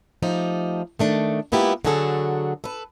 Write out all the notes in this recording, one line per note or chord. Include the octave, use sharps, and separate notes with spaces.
F3 A3 D#4 G4
D#3 A3 D4
G#3 A#3 B3 E4 F4 G4
D3 F#3 F#4 G#4 A4
A4 B4